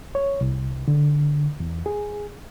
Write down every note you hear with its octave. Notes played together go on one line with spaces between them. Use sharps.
C#5
C2
D3
E2
G#4